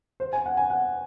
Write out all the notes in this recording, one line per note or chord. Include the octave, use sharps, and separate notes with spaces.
C5
G#5
F#5
G#5
F#5